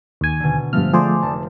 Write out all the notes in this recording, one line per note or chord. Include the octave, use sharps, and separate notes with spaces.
D#2 G#5
B2 D3
G2 F3 G#3 A3 B3 F6
F3 A3 C4 G#4 C5 D5
F1 A5